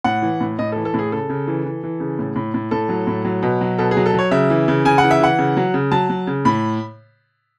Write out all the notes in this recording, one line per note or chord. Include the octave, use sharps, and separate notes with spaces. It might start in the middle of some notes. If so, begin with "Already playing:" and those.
A2 F#5
E3
A2
A2 D#5
A4
E3
A4
A2 G#4
C#3 A4
C#3
E3
E3
E3
C#3
A2
A2
A2
A2 A4
F#3
A2
F#3
B2
F#3
B2 A4
G#4
F#3
A4
F#3 C#5
C#3 E5
E3
C#3
C#3 G#5
F#5
E3
E5
E3 F#5
C#3
F#3
C#3
F#3 A5
F#3
C#3
A2 B5